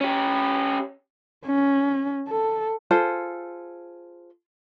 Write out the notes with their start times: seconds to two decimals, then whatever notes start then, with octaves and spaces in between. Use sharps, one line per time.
0.01 C#4 G4
1.46 C#4
2.28 A4
2.91 F4 G#4 A4 C5